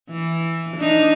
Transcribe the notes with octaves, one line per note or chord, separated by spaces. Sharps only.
E3
D4 D#4